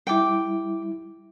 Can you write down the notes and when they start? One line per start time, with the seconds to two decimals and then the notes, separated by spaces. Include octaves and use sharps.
0.07 G3 E4 G5 D6